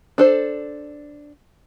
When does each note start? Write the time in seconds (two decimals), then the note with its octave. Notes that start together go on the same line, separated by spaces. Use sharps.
0.18 D4 A4 C5